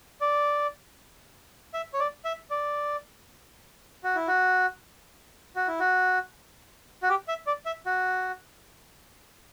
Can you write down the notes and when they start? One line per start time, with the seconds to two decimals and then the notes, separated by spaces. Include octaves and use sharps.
0.21 D5
1.74 E5
1.93 C#5
2.00 D5
2.25 E5
2.50 D5
4.04 F#4
4.15 E4
4.28 F#4
5.56 F#4
5.68 E4
5.80 F#4
7.03 F#4
7.09 G4
7.28 E5
7.47 D5
7.66 E5
7.86 F#4